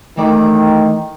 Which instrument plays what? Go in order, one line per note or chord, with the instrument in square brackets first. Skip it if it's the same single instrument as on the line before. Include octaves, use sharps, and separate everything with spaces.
[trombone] D#3 [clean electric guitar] E3 A3 D5